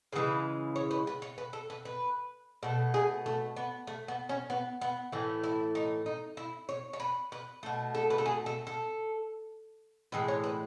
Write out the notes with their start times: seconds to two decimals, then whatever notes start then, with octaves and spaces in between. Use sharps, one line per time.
0.12 C#3 E3 G#3 B4
0.76 C#5
0.91 B4
1.07 B4
1.22 C#5
1.38 B4
1.53 A4
1.70 B4
1.85 B4
2.63 B2 A3 A4
2.94 G#4
3.26 A3
3.56 B3
3.87 A3
4.08 B3
4.29 C#4
4.50 B3
4.81 B3
5.12 A2 E3 A3 C#4
5.44 E4
5.75 D#4
6.06 D#4
6.37 E4
6.69 C#5
6.93 C#5
7.00 B4
7.32 B4
7.63 B2 A3
7.95 A4
8.10 B4
8.18 A4
8.26 G#4
8.46 A4
8.67 A4
10.12 A2 E3 G#3 B4
10.28 C#5
10.44 B4